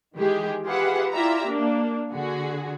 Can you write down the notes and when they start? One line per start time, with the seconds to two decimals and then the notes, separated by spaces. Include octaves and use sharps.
0.16 D#3 E3 G#3 G4 G#4
0.66 F4 G4 G#4 B4 E5 F#5
1.12 E4 F4 G4 D5 E5 A#5
1.47 A#3 D4
2.12 D3 F#4 G#4